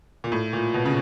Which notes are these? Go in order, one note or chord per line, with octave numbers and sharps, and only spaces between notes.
A#2
A2
A#2
B2
C#3